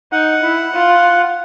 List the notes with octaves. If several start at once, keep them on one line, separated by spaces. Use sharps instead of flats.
D#4 F#5
E4
F4